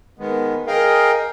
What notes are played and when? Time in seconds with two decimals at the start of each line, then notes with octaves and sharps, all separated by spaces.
0.19 D#3 G#3 B3
0.67 G#4 A#4 D#5 F5 G5